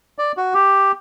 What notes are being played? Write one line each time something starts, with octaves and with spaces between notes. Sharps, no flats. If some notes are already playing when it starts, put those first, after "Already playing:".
D5
F#4
G4